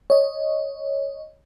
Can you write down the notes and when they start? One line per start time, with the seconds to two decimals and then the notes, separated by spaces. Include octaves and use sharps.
0.10 C#5 D#5